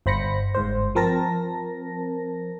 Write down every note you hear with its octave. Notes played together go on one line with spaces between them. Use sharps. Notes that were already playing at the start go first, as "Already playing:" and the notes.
G1 C5 B5 A#6 C#7
G1 G#2 C5
F3 C4 A#4 A5 A#6